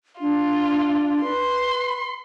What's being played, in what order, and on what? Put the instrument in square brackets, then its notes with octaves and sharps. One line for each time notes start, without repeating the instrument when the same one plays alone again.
[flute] D4 [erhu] F4
[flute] B4 [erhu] C6